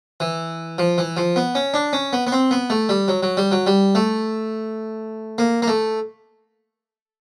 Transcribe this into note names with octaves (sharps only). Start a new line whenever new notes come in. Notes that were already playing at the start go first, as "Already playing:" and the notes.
E3
F3
E3
F3
B3
C#4
D4
C#4
B3
B3
C4
B3
A3
G3
F#3
F#3
G3
F#3
G3
A3
A#3
A#3
A3